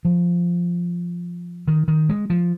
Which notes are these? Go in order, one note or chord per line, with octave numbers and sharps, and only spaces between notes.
F3
D#3
D#3
G#3
F3